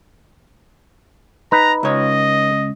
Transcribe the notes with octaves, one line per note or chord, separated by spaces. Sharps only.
D#4 B4 A#5
C#2 C#5 D#5